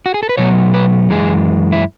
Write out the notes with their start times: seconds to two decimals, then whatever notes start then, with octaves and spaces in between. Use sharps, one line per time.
0.06 F#4
0.14 G#4
0.23 A4
0.29 B4
0.37 B2 F#3 A3 C#5
0.74 B4
1.10 F#2 E3 G#3 G#4
1.72 E4